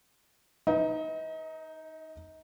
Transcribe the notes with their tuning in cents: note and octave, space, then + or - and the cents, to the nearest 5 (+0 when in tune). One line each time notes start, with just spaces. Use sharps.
D#4 +0 B4 +0 D#5 +35